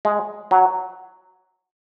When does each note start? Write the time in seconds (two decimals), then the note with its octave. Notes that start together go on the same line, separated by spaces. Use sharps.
0.05 G#3
0.51 F#3